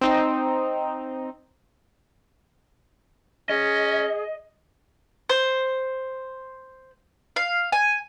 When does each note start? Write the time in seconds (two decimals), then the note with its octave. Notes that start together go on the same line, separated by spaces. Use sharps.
0.01 C4 D#4 D#5
3.50 C#4 G#4 D#5
5.29 C5
7.36 F5
7.72 G#5